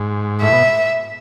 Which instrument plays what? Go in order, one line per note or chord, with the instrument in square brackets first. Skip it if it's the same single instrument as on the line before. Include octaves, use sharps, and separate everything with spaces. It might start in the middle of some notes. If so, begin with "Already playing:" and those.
Already playing: [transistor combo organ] G#2
[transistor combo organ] A2 [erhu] E5
[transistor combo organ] B2